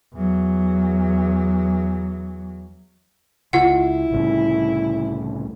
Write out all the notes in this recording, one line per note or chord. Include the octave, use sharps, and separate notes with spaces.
E2 F#3
C#2 E4 F4 F#5
C2 A2 C#3